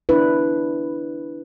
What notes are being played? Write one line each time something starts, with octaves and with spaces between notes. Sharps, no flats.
D4 E4 B4